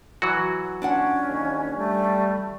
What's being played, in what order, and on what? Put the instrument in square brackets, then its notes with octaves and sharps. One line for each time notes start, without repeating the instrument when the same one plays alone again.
[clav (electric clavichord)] E3 F#3 F#4
[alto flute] C#4 [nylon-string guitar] D4 F4 F#5
[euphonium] D#2
[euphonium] G3 [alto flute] A3